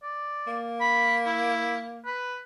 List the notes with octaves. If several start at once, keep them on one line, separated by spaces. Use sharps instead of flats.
D5
A#3
B5
E4
B4